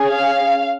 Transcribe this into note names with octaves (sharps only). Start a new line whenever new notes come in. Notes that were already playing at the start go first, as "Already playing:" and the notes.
Already playing: C#4 G#4
F5